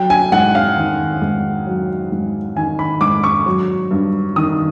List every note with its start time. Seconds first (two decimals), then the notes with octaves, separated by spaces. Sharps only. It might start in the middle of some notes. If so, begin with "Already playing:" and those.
Already playing: F#3 G5
0.10 G#5
0.32 G#2 F#5
0.55 F5
0.77 D#3
1.22 G#2
1.67 F#3
2.12 G#2
2.56 D#3 G#5
2.79 B5
3.01 G#2 D6
3.24 C#6
3.46 F#3
3.91 G2
4.36 D#3 D#6